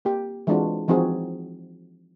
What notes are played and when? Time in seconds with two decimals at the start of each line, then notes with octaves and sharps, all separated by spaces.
0.05 A#3 G4
0.47 E3 G#3 C4 D4 F4 F#4
0.88 E3 F3 C4 D#4 F#4 G#4